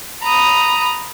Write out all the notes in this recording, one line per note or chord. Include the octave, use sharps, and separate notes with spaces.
A#5 B5 D#6